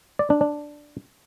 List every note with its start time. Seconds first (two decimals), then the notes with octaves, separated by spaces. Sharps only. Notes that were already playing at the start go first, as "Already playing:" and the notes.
0.19 D5
0.30 D4
0.41 D4